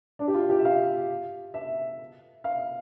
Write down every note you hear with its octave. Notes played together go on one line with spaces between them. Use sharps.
D4
G4
F4
G4
E5
F5
E5
F5